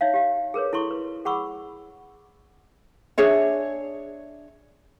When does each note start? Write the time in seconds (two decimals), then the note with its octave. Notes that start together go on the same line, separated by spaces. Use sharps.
0.01 D#4 C#5 E5 F5
0.14 G4 F5
0.54 G#4 A#4 B4 C#5
0.73 E4 A4 C6 C#6
0.91 B4
1.25 G#4 F#5 B5 C#6 E6
3.18 D4 G#4 C#5 E5